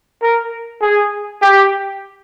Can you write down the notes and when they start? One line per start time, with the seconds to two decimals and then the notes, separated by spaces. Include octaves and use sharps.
0.22 A#4
0.82 G#4
1.42 G4